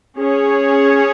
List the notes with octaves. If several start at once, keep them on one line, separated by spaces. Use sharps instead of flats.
C#4 G#4 C#5